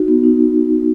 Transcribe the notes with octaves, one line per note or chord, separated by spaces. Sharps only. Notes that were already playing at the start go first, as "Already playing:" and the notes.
Already playing: D#4 F#4
B3
D#4
B3